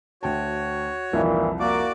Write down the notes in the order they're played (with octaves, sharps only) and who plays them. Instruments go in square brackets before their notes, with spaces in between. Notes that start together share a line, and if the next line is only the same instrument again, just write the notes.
[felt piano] D2 G5 A5 [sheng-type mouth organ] F#4 C#5
[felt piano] C2 F2 [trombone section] A#2 D#3 E3
[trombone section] A#3 [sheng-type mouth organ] F#4 D5 D6